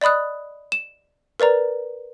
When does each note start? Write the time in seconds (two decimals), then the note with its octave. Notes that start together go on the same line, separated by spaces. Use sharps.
0.01 D5 D#5 B5 D#6 F#6
0.72 E7
1.40 A#4 B4 D5 A#5